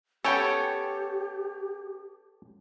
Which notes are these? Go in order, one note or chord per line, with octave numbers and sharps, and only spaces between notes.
B3 C#4 G4 A4 C#5 G5